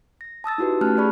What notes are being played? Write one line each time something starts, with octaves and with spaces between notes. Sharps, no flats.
A#6
A5 D#6 E6 A6
D#4 E4 F#4 G4 B4
A3 C#4 G4 A5 F6 F#6
G4 G#4 D5 B5 C#6